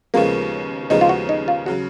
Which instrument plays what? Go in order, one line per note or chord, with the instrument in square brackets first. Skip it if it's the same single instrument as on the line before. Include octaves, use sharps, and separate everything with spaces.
[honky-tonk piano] D#2 C#3 F3 G#3 B3 [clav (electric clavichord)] A#3
[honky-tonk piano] D#2 C#3 F3 G#3 B3 [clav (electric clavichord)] D#4
[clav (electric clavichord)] F4
F#4
D#4
F4
[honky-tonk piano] C#3 F#3 [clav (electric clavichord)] F#4